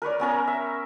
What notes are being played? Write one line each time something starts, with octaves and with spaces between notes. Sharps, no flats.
A#4 B4 C#5 D5
B3 C#4 A#4 A#5
E5